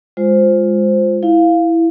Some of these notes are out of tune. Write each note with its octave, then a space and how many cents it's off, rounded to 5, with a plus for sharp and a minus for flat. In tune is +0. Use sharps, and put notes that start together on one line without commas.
G#3 -10 F4 +10 C5 +0
E4 +0 F5 +0